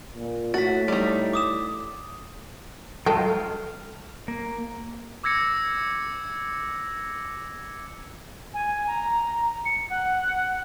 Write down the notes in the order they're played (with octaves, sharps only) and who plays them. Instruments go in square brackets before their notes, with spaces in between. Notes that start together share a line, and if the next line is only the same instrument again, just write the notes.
[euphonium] A#2
[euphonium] A2 [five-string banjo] F#4 [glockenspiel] A6 B6
[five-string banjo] G3 D#4
[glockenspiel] D6 D#6 E7
[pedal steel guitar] F#3 G#3 F4 [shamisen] A4 G5
[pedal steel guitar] F6
A#3
[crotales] D6 E6 G#6 A#6 C#7
[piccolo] G#5
A#5
C#7
F#5